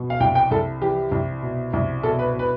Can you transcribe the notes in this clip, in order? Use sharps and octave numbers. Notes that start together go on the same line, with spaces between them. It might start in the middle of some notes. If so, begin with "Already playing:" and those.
Already playing: B2
F5
C2 G5
G5
C2 A4
E3 G4
C2
B2
C2
B2 A4
B4
B2
B4